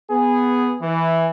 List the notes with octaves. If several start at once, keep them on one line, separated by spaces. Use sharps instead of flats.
B3 G#4
E3